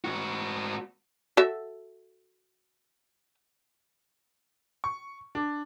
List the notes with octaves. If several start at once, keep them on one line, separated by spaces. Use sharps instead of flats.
G#2 F#4
F#4 A4 E5
C#6
D4